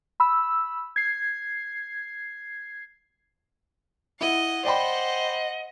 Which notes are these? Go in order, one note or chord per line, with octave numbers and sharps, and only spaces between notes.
B5 E6
G#6 C7
E4 D#5 F#5
C5 D5 D#5 G5 B5